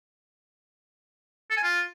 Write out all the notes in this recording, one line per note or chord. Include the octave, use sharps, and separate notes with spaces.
A4
G#5
F4